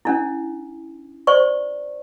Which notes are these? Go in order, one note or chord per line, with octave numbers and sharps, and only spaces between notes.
C#4 D4 E4
C5 D5 C#6